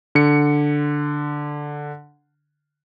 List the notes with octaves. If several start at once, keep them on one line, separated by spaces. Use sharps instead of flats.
D3 C#7